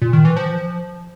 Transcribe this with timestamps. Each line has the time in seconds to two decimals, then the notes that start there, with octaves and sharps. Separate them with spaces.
0.02 A#2
0.13 D#3
0.25 E3
0.36 F3